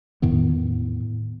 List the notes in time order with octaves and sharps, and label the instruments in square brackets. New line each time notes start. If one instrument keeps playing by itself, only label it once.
[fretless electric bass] E2 A2 D#3 B3